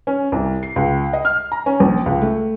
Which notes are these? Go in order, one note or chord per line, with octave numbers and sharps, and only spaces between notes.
C#4
C2
C7
C#2
D#5
F6
A#5
C#4
A#1
C#2
A3